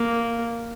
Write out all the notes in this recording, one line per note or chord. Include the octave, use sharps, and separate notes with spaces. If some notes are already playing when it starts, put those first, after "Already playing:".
Already playing: A#3